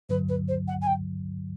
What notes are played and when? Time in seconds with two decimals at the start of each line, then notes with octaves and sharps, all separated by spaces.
0.09 G2 D3 F#3 B4
0.28 B4
0.48 C5
0.67 F#5
0.81 G#5
0.86 G5